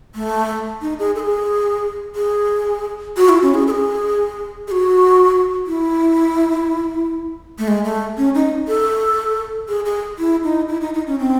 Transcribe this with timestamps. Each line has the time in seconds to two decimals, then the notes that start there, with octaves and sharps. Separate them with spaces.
0.15 A3
0.82 D#4
0.99 G#4
1.16 A4
1.19 G#4
2.16 G#4
3.17 F#4
3.29 E4
3.42 C#4
3.54 G#4
3.67 A4
3.70 G#4
4.68 G#4
4.71 F#4
5.67 E4
7.59 A3
7.68 G#3
7.84 A3
8.18 C#4
8.35 D#4
8.68 A4
9.69 G#4
9.85 G#4
10.19 E4
10.44 D#4
10.68 E4
10.81 D#4
10.94 D#4
11.07 C#4
11.19 C4